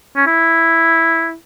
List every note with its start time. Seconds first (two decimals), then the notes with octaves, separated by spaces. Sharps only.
0.16 C#4
0.27 E4